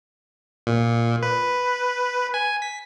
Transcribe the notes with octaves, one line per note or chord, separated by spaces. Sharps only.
A#2
B4
G#5
B6